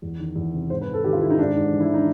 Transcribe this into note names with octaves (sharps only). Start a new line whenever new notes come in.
E2
D#3
E2
C3
G#2 C5
B4
G#2
A4
D#3 G4
F4
D#3 E4
D#4
G#2 D4
G#2
E3
E4
E3 D#4